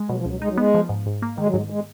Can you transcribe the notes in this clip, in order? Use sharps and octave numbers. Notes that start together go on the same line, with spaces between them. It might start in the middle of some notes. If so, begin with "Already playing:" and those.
Already playing: G#3
B2 F#3
F3
C#2
F#3
G#3 D#4
F#3
G#3 B3
F3
G#2
G#2
A#3
D#3 G#3
F#3
G#2 G#3
G#3